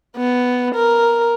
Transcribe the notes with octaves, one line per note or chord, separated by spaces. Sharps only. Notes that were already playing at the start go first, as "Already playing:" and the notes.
B3
A#4